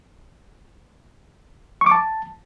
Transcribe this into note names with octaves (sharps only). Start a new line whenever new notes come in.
C#6
D6
A5